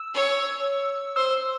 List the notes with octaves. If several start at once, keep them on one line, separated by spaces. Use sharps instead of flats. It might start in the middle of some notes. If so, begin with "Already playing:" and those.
Already playing: E6
C#5
C5 E6